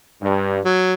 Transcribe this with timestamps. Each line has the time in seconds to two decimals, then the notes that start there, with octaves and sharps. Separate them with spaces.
0.22 G2
0.65 F#3